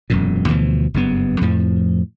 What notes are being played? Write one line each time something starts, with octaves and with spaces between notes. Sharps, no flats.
E1 F#2 A#2
D2 B2 E3 F3
F#1 G2 B3
F2 A2 F3